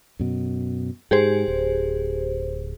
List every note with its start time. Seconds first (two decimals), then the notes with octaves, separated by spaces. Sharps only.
0.20 F#2 B2
1.11 G#2 G4 G#4 C5
1.48 D1